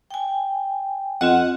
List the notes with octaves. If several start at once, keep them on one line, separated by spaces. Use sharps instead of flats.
G5 G#5
F2 C4 F4 D#5 F#5